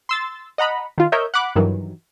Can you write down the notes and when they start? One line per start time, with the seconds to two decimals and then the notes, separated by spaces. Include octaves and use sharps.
0.09 C6 E6 A6
0.58 D#5 F#5 A#5 B5
0.98 D#3 F4
1.12 A#4 C#5 D#5 E5 G6
1.34 F#5 B5 D6 F#6
1.56 G2 D#3 E3 F#3